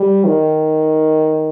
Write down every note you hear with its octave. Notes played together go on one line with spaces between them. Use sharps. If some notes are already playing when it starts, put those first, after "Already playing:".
Already playing: G3
D#3